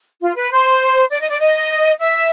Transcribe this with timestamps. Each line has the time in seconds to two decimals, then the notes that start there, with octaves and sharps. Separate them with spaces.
0.21 F4
0.36 B4
0.51 C5
1.11 D5
1.20 D#5
1.30 D5
1.40 D#5
1.99 E5